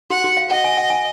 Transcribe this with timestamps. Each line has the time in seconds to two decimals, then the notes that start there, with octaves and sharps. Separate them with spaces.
0.10 F#4 F#5
0.24 F#4
0.37 F5
0.51 D#5 F#5
0.64 G#5
0.77 F#5
0.90 G#5